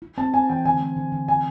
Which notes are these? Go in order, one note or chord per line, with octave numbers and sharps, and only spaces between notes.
E4
C4 A5
C4 G#5
E3 G5
D3 G#5
A3
D3
D3
C3 G#5